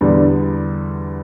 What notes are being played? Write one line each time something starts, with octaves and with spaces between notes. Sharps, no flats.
E2 D3 G3